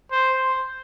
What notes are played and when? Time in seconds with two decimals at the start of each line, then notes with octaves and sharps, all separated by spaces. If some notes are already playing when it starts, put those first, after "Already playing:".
0.11 C5